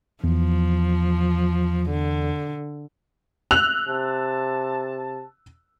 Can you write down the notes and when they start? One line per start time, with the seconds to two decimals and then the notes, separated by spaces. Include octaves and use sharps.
0.24 E2 F3
1.90 D3
3.51 E6 F#6 F7
3.88 C3 A5